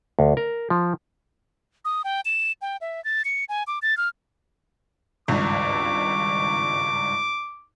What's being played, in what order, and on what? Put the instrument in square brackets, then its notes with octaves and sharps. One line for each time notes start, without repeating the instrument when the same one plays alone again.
[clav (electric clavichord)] D2
A#4
F3
[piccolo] D#6
G5
E7
G5
E5
A6
C#7
G#5
D6
A6
F6
[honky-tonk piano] G#1 C#2 G2 [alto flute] C#6 [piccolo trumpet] D6